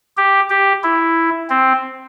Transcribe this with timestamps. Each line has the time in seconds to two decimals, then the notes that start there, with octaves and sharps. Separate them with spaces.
0.17 G4
0.50 G4
0.83 E4
1.50 C4